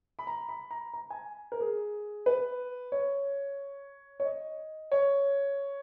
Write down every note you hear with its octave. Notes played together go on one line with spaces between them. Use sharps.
B5
A#5
B5
A#5
A#5
G#5
A#4
G#4
B4
C#5
C#5
D#5
C#5